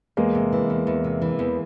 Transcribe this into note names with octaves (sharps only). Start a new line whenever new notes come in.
E2 G#3 A#3
C3
E3
E2
E2
C3
E3
E2